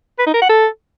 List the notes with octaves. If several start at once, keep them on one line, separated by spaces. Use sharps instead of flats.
B4
D#4
A#4
F#5
A4